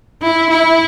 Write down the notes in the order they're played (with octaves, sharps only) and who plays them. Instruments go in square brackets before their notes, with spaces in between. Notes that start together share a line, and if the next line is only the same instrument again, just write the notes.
[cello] E4
E4